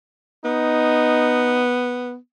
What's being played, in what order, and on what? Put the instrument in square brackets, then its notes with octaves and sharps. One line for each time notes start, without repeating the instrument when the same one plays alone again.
[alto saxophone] B3 [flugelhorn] D#4